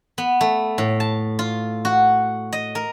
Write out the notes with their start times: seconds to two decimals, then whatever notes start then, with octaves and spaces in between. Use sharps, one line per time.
0.18 B3
0.41 A3
0.78 A2
1.00 A5
1.39 F4
1.85 F#4
2.53 D#5
2.75 A#4